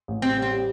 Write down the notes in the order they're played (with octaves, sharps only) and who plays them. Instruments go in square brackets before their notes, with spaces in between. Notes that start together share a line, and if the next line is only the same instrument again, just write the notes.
[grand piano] A1
[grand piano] G3 [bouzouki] C4
[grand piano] G3
[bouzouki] C4
[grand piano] G3